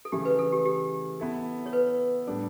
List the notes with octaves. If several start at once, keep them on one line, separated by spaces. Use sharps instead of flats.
A4
C#3 E3 A3 E4 G4
B4
A4
G4
G4
B3 E4 A4
C#5
B4
A2 G3 D4 A4 D5